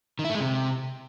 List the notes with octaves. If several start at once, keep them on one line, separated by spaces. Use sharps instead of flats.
D#3
E4
A3
G#3
C3